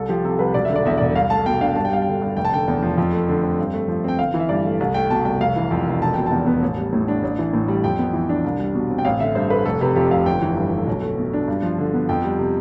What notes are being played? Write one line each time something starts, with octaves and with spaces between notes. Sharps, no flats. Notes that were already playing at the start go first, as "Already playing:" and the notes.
Already playing: C2 A4
F3 G4
C3 A4
C2 B4
E1 D5
D3 E5
D5
E2 E5
E1 D5
C2 F5
A3 A5
B2 G5
D4 F5
G2 A5
G5
G3 F5
G5
D3
G2
F1 G5
A5
D3 G5
E2
F3
F2
A3
D3
C4
G2
A3
F3
C4 G5
G1 F5
E3
E5
G2 D5
A3
C2
A3 G5
B2 A5
C2 G5
F1 F5
E3
F2
F1
E1 A5
B2 G5
E2 A5
B3
A1
G3
A2
D4
A1
E3
A2
G3
F2 G5
B3
E3
D4
C2
G3
B2
C4
G5
A1 F5
D3 E5
G2 C5
A3 B4
F1 A4
C3 B4
F2 G4
F1 F5
G1 G5
E3
G2
A3
B1
A3
B2
D4
G2
F3
D3
B3
F2 G5
G3
C3